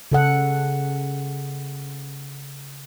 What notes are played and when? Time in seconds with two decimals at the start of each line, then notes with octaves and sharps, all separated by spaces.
0.12 C#3 A4 F#5